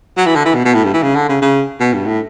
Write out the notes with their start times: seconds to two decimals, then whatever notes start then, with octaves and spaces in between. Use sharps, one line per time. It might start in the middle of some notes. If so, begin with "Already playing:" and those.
0.17 F#3
0.26 E3
0.36 D3
0.46 E3
0.55 B2
0.65 B2
0.74 A2
0.85 G2
0.94 E3
1.03 C#3
1.15 D3
1.29 C#3
1.42 C#3
1.80 B2
1.94 G2
2.06 A2